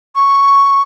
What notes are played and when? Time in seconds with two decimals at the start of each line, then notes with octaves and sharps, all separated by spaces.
0.16 C#6